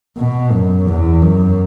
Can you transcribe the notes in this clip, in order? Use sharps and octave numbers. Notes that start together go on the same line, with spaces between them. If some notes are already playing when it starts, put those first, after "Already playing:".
B2
F#2
E2
F#2